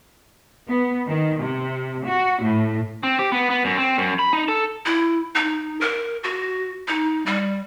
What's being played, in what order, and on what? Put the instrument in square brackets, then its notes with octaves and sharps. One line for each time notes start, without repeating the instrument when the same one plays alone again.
[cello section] B3
D#3
C3
F#4
A2
[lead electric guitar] C4
G4
B3
B3
F#2
C4
F#2
B5
D#4
A4
[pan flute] E4
D#4
A#4
F#4
D#4
G3